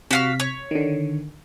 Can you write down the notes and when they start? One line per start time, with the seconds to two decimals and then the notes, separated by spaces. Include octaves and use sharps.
0.11 C3 F#4 F5 F6 B6
0.40 C#5
0.71 D3 D#3